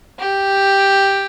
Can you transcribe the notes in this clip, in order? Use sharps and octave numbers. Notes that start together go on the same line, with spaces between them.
G4